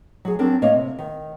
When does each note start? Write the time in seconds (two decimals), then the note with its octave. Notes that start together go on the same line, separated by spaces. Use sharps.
0.25 F#3 G#4
0.39 F#3 C4 D4 A#4
0.62 A2 A#3 C#5 D#5
0.73 C3
0.99 D#3